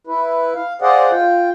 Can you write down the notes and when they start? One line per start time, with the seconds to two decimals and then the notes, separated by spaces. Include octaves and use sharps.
0.07 E4 B4
0.55 F5
0.82 G#4 C5 D5 D#5 F5 F#5
1.11 F4 G5